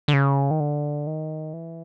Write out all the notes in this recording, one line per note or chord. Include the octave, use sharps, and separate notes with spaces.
D3
C#3
D#3
D3
D#3
E3